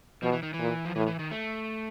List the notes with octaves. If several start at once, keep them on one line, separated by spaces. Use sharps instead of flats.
B2 F3
E3
D#3
E3
A#2
F3
A2 E3
E3
D#3
A3